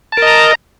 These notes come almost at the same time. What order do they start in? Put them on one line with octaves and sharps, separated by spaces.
A5 A#4 D#5 A#5